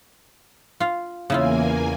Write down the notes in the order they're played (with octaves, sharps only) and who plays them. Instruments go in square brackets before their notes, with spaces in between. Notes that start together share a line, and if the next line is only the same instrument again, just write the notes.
[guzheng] F4 F5
[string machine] E2 A#3 G#5 [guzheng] C#3 E4 F4